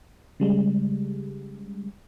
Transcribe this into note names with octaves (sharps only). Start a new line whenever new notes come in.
C#3 G3 G#3